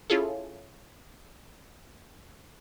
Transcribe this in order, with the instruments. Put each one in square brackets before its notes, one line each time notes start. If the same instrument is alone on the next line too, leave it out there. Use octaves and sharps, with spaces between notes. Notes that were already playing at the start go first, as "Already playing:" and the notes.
[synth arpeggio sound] C#4 E4 F4 G#4 A4